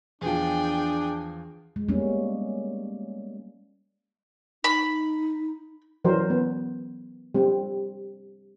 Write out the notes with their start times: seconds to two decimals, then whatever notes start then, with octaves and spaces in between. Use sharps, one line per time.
0.22 E2 F3 D4 G#4 G5
1.76 G#3
1.89 G3 G#3 A#3 B3 C#4
4.64 D#4 B5
6.05 E3 F#3 A#4 C5
6.30 B3
7.34 G3 C4